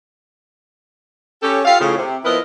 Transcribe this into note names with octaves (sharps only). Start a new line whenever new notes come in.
C#4 G4 A4
F4 G4 A4 F5
A2 C#3 F3
C3
F3 B3 E4 A#4 B4 D#5